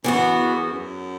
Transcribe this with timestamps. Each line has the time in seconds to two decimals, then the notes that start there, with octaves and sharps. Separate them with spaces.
0.04 F#2 E3 B3 F#4
0.38 E2
0.72 F#2